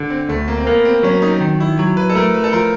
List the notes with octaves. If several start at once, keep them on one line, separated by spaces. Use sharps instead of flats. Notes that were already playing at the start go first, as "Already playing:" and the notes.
Already playing: D3
C4
D2 A3
A#3
C4
A#3 B3
C4
F#3 C#4
D#4
D#3
E4
F#3
B4
A4
A3 A#4
B4
A4
F3 A#4